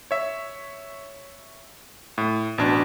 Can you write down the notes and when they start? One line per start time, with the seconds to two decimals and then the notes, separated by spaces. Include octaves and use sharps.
0.11 C#5 E5
2.18 A2
2.58 A1 B2 D4